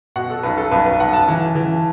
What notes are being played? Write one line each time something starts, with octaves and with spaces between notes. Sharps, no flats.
B2 F#5
A4
B1 B4
A4
B1 B4
B4
B1 F#5
A5
E3
E3